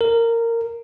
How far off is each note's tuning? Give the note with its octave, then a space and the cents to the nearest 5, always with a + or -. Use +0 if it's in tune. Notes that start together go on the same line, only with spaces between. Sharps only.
A#4 -15